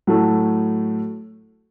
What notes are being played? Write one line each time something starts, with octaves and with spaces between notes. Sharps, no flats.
A2 F#3 A3